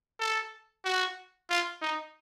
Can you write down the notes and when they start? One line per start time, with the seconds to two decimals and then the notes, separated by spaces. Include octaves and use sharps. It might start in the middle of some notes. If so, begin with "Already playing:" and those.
0.20 A4
0.85 F#4
1.50 F4
1.82 D#4